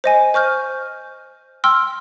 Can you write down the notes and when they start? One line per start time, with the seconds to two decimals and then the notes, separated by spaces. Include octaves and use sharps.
0.04 C5 D#5 G#5
0.34 C5 C#6 F6 G6
1.64 G5 C6 E6 F6